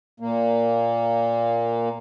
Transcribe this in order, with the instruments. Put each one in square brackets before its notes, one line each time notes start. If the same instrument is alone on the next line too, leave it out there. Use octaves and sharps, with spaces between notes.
[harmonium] A#2 A#3